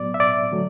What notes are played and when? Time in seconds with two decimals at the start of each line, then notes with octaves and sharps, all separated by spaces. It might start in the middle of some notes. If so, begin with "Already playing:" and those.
Already playing: A2 F#3 B3 D5
0.14 E5
0.20 D5
0.51 D3 F#3 A3